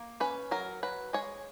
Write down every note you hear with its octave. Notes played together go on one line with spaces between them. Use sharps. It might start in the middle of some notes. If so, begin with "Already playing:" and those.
Already playing: A#3
C#4 B4
F#3 A#4
F#3 B4
G#3 C#5